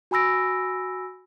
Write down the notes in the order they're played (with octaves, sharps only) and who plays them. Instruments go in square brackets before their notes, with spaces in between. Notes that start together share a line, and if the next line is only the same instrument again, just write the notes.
[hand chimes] F#4 G#5 B5 E6 A#6 D7